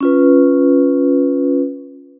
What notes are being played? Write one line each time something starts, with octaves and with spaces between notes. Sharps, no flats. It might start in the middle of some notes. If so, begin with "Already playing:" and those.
C#4 F4 B4